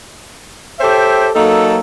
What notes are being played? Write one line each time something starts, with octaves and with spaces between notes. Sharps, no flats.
G4 A4 C5 C#5 E5 G5
F#3 A#3 D#4 A4